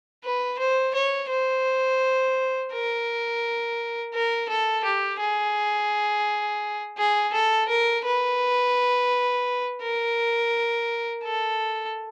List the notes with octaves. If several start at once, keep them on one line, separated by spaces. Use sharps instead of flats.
B4
C5
C#5
C5
A#4
A#4
A4
G4
G#4
G#4
A4
A#4
B4
A#4
A4